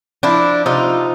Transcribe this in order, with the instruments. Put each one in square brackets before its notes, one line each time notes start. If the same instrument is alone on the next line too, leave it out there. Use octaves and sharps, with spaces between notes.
[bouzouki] F3 D4 E4
C3 D#4 F4